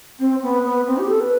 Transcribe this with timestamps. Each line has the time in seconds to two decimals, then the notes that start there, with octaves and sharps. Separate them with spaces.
0.19 C4
0.43 B3
0.65 B3
0.87 C4
0.98 G4
1.09 A4
1.21 B4